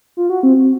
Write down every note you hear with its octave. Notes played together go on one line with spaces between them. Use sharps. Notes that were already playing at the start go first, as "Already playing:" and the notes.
F4
F#4
C4